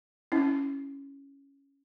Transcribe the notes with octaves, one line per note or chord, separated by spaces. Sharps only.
C#4 E4